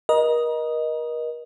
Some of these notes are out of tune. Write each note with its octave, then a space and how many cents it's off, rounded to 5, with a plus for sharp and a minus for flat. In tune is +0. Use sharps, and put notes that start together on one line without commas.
A#4 +35 D#5 +0